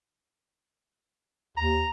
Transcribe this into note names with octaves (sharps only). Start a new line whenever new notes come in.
D#2 A#5